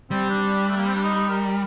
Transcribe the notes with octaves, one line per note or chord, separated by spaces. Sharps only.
G3 C4
D4
A3
A#3
C4
D4
D#4
A#4